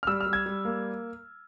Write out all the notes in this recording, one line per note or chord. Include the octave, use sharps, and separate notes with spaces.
F6
G3 E6
F6
G3
G#6
G3
A#3